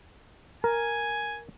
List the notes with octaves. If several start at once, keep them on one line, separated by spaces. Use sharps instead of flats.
A#4 G#5